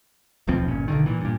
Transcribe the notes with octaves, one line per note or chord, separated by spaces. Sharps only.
D#1 B1 F3 C4
G1 A#2 C#4
B1 D3 D#3
A#2 E3
G2 A#2